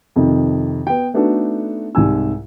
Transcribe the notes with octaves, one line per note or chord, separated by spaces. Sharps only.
F2 C3 D#3
B3 G5
A3 B3 D4 D#4 F#4 A4
C2 G#2 G#5 E6